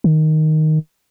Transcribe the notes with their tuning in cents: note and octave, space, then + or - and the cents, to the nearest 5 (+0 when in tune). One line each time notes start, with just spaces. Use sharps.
D#3 +0